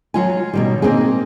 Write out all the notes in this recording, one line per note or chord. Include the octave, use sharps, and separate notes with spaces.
F#3 F4 G#5
B2 D#3 G3
A#3 C4 D#4 G#4